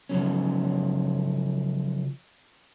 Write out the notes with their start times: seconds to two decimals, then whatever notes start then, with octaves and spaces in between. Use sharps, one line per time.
0.09 C#3 F3 F#3 C#4